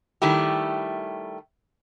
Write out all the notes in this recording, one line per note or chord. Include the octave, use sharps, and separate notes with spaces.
D#3 G3 A3 E4 G4